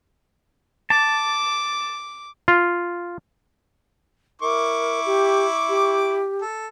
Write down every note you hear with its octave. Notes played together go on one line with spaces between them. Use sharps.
A5 D6
F4
E4 A#4 C#6 D6
G4
G4
A4